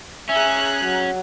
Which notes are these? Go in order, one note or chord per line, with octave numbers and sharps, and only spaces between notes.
C#4 G#4 E5 A#5 F#6
F#3